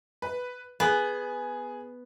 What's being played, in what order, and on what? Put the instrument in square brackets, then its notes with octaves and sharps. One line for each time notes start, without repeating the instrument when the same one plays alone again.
[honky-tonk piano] B4
[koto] B3 [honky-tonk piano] G#4